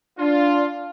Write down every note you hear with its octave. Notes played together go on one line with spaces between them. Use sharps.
D4 F4